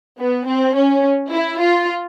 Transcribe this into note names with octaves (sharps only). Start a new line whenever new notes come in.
B3
C4
C#4
E4
F4